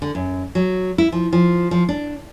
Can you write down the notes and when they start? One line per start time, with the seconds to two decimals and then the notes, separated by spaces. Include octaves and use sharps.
0.02 D3
0.15 F#2
0.55 F#3
0.98 E4
1.12 F3
1.33 F3
1.71 F3
1.89 D4